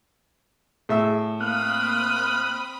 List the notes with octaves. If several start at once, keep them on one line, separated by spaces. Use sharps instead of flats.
A2 G#4 E5 E6
A#3 C4 B5 D#6 F6 F#6